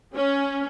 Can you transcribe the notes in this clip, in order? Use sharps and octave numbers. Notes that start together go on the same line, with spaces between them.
C#4